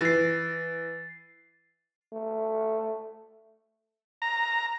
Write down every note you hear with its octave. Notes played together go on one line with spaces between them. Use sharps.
E3 A6 C7
A3
A#5